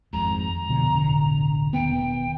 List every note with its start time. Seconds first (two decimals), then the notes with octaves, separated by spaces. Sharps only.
0.13 G#1 F2 G#2 A#5
0.69 F2 B2 D3
0.93 E1 A1 D3
1.73 E1 D#3 B3 G5